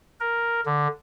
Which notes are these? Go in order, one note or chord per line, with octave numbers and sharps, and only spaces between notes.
A#4
D3